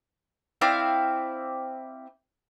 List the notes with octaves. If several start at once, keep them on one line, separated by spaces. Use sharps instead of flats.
C4 E4 D5 F5